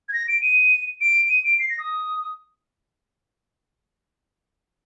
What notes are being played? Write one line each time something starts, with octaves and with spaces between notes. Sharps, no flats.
G#6
A#6
D7
D#7
D7
D#7
D7
C7
A#6
D#6